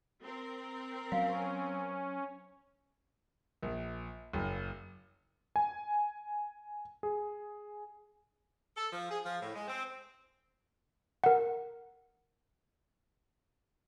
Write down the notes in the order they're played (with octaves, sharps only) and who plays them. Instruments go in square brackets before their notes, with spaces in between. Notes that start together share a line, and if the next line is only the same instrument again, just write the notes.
[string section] C4 A#4
[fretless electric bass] F#3 [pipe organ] C#4 [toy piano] F5
[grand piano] A#1
F#1
[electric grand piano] G#5
G#4
[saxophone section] A4
F3
G#4
F3
A2
G#3
C4
[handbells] A#4 F#5